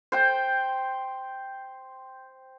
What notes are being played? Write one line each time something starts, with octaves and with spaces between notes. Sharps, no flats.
C5 G5